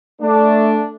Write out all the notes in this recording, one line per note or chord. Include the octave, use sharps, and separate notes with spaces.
A3 D4